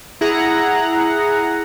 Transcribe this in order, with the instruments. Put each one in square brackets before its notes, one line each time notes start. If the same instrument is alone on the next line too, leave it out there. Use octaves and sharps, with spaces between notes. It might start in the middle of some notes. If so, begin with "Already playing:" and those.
[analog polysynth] E4 G#4 F#5 A#5